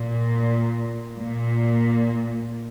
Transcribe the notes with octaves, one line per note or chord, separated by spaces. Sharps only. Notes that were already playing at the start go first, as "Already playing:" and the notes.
Already playing: A#2
A#2